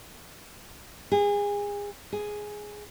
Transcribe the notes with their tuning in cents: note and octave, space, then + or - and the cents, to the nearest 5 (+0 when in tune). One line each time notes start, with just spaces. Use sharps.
G#4 -30
G#4 +5